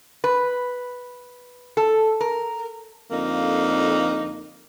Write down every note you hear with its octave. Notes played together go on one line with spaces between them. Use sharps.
B4
A4
A#4
F2 D3 A#3 D#4